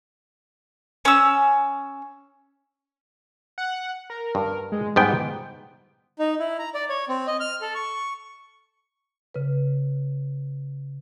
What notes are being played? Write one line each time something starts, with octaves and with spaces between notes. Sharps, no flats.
C#4 E6
F#5
A#4
G2
G#3
G#2 G3 B3 G5
D#4
E4
A#5
D5
C#5
C4
D#5
F6
A4
C#6
C#3 B4